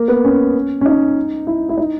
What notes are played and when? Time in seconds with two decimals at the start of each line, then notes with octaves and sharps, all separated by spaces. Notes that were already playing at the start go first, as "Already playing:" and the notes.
Already playing: A#3
0.08 B3
0.24 C#4
0.81 C#4
0.86 D#4
1.47 E4
1.69 E4
1.77 D#4